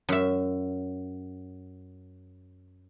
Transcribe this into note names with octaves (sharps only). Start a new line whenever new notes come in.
F#2 E5